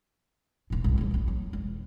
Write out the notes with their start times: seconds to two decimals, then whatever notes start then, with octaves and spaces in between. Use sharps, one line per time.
0.70 D#1 A2
0.84 C2 G#2
0.98 D1 A1
1.11 A1 D#2
1.28 F#3
1.53 E1